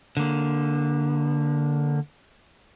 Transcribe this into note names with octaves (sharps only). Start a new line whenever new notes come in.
D3 A#3